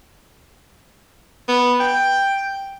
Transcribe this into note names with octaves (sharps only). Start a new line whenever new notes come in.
B3
G5